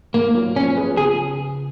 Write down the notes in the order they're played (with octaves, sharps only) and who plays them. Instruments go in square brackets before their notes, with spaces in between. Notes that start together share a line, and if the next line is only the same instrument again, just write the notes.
[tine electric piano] G#2 [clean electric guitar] A#3
[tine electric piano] F#3 A#3 F4
[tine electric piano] F3 [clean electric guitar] C#4
[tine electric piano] B3 F4 G#4 B4
[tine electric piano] C#3 [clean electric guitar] G#4